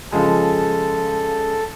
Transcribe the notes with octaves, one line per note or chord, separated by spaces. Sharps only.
C#3 F3 G#3 A4